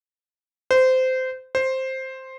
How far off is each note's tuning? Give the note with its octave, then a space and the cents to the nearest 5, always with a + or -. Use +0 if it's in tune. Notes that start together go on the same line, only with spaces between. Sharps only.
C5 -20
C5 +5